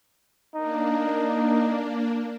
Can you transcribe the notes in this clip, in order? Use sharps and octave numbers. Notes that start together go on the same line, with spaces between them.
A#3 D4 D#4